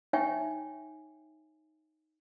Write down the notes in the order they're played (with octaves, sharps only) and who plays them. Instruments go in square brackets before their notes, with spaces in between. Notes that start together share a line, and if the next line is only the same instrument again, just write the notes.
[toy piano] D#4 C#5 E5 G5 G#5 C#6